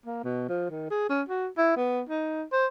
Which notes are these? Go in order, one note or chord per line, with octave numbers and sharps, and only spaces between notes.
A#3
B2
F3
D#3
G#4
C#4
F#4
E4
B3
D#4
C5